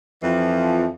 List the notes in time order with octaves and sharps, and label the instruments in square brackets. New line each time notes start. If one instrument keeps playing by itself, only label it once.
[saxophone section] F2 E3 F3